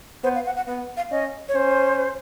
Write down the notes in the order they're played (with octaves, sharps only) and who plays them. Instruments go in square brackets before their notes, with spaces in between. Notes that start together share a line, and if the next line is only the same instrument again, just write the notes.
[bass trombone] B3 [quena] C5
[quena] F5
F#5
F#5
[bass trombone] B3 [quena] F#5
[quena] F5
[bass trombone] C#4 [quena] D#5
[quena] C#5
[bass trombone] C#4 [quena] C5